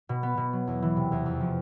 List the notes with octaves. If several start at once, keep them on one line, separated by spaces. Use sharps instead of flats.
B2
B3
B2
F#3
E2
E3
C3
E2
F2
F3